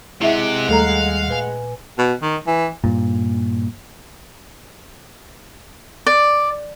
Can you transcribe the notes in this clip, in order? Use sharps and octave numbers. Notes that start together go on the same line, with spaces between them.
C3 G#3 E4 G4 E5 F#5
D#2 D#3 G3 A3 A4 F5 A#5
A#2 B4 G#5
B2
D#3
E3
G2 A#2
D5